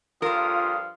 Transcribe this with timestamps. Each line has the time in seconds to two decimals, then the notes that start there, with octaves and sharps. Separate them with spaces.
0.22 G2 F3 F4 A4 A#4 F5 D#6